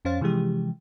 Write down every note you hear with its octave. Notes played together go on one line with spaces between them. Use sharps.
F2 C#4 C5 F5 A6
C3 E3 F3 G#3 G4